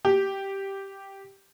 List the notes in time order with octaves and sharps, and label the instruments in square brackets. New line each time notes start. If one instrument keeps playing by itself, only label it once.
[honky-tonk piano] G4